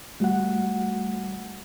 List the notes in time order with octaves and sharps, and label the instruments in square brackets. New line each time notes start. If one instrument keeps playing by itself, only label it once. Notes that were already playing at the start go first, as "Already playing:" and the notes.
[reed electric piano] G3 F#4 F#5 [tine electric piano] A3